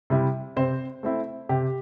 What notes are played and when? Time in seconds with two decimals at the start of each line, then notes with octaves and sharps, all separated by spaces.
0.10 C3 G3 E4
0.56 C3 C4 C5
1.03 A3 C4 E4
1.49 C3 G4